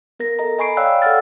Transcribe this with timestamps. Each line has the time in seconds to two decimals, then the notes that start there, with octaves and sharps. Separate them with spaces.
0.19 B3 A#4 A#6
0.39 A4 D#5 A#5
0.59 D#5 G#5 B5 C#6 C7 D7
0.77 C#5 D5 F5 G5 E6 F#6
1.02 A4 D5 F#5 E6 F6 A6